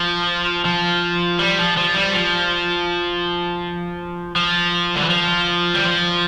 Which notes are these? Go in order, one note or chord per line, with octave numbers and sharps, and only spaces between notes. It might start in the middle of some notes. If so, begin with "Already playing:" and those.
Already playing: F3
F3
G3
F3
F3
G3
F3
F3
D3
E3
F3
G3
F3